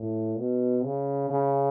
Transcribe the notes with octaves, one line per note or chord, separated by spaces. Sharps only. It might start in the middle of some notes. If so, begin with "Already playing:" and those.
Already playing: A2
B2
C#3
C#3